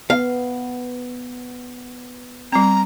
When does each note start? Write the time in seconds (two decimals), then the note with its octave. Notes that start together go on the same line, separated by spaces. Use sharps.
0.10 B3 F5
2.53 G3 C4 A#5